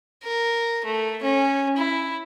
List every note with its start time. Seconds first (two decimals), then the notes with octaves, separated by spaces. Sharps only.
0.24 A#4
0.85 A3
1.23 C#4
1.77 E4